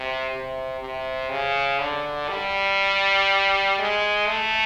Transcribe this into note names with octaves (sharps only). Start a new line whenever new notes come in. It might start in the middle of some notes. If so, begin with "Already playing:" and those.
Already playing: C3
C3
C3
C#3
D3
G3
G#3
A3